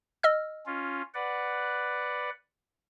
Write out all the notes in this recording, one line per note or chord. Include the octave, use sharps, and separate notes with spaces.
D#5 E6 F6
C#4 F4
B4 D5 F#5